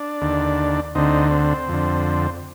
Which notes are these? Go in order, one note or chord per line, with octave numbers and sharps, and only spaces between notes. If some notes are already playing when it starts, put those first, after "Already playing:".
Already playing: D4
D#2 D3
D2 D3 C4 D#4
C4
F2 D3